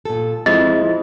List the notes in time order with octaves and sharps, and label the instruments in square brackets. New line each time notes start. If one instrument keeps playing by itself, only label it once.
[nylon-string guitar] A#2 A4
[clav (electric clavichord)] F2 [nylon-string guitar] G#3 E4 [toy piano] D#5